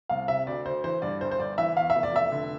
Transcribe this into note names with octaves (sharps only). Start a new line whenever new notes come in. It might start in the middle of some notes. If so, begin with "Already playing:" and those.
C2 F5
C3 E5
D2 D5
D2 C5
E3 C5
G2 D5
G1 C5
C5
G1 D5
E3 E5
E2 F5
E5
F1
D5
F1 E5
D3